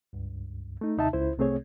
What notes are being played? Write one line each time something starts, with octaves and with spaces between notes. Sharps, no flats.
C#2 G2
A3 D#4
D#2 C3 D#4 E5 A5
C#2 E4 C5
C2 C3 A3 C4 G#4 C#5